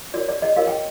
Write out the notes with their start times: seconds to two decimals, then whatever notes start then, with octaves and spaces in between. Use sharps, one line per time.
0.14 F#4 A#4 C#5 D5
0.28 D5
0.42 D#5
0.56 F#4 A#4 C#5 F5
0.67 G5